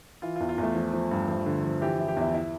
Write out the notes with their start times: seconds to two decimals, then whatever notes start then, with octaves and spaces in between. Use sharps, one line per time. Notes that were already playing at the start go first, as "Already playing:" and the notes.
0.22 E3 F4
0.36 F4
0.40 E2
0.49 F4
0.58 E2 A3
0.75 F3
0.93 F3
1.11 G2
1.28 F3
1.46 D3
1.64 F3
1.81 E3 G4
1.99 E3
2.08 G4
2.17 E2 E4
2.35 E4